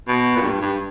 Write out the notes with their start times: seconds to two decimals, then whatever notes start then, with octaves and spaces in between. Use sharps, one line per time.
0.08 B2
0.37 A#2
0.41 G2
0.61 G2